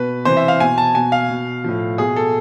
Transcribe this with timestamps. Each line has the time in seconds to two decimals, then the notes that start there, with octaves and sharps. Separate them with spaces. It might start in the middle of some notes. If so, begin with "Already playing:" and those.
Already playing: B2 B4
0.25 C3 E3 C5
0.37 E5
0.48 F5
0.60 B2 G#5
0.78 A5
0.95 B2 G#5
1.12 F5
1.30 B2
1.64 A2 F3
1.98 B2 G#4
2.16 A4